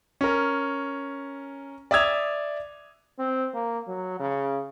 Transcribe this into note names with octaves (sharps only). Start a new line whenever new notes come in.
C#4 A#4
D5 E5 D#6 E6 G#6 F7
C4
A#3
F#3
C#3